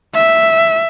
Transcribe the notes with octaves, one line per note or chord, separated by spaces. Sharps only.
E5